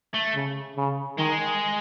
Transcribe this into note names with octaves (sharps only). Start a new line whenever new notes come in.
A3
C#3
C#3
D#3 G#3